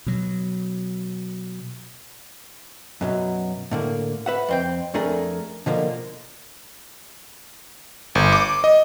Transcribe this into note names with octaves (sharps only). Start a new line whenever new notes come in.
B2 F#3
F#2 B2 F#3
A2 D3 A#3
B4 E5 F#5
F2 C4 G5
F2 A3 D4 G#4 A#4
B2 D3 F3 A#3
G1
D6
D#5